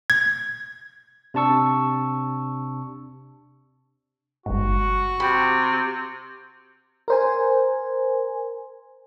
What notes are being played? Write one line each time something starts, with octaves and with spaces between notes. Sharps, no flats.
G#6
C3 D4 A5 C#6 E6
G1 G#2 F#4
C3 G4 B5
A#4 C5 G#5